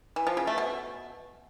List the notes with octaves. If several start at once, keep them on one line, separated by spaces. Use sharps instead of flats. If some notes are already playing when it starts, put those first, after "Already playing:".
E3
F3
C#3
A3
B2